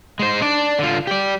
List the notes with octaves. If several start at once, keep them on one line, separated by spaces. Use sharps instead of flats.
G#3 C5
D4 D5
D3 F4
G4 D5